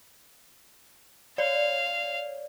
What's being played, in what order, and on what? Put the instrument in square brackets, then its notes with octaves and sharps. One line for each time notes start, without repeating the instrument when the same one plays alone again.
[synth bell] C#5 D5 [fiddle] F5